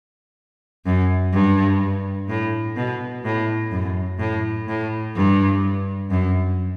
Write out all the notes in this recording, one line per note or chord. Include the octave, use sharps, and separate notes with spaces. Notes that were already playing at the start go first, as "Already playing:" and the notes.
F#2
G2
A2
B2
A2
F#2
A2
A2
G2
F#2